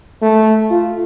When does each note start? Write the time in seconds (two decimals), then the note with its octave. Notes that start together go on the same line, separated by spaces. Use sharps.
0.22 A3
0.71 F4